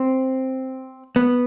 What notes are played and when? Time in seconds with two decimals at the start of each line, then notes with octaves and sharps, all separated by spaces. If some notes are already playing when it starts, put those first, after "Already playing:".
Already playing: C4
1.16 B3